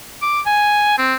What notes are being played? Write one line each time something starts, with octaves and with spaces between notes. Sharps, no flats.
D6
G#5
C4